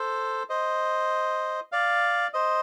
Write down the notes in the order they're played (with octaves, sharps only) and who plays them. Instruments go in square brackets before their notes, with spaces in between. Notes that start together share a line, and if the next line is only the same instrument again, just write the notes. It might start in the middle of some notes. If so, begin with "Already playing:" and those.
Already playing: [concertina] A4 C5
C5 D#5
D5 F5
C5 D#5